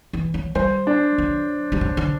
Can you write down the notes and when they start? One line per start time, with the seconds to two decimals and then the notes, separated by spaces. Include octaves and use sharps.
0.13 E3
0.34 F#3
0.55 G3 C5
0.87 D4
1.18 F#3
1.72 G3
1.81 F#3
1.97 D3